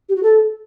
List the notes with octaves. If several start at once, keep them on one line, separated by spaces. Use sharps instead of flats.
G4
F#4
A4